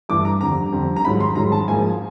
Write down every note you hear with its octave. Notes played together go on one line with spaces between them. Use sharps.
G2 E3 A3 D6
A#5
F2 D3 G3 A#5
F2 D3 G3
A#5
G#2 D#3 F#3 B5
C6
G#2 D#3 F#3 A#5
A5
G#2 F3 A#3 G#5